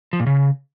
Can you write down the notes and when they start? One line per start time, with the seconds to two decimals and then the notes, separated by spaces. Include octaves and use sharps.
0.13 F3
0.20 A#2
0.26 C#3